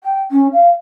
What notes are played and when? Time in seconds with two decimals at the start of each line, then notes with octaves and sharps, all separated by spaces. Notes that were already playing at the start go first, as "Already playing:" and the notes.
0.04 G5
0.31 C#4
0.53 F5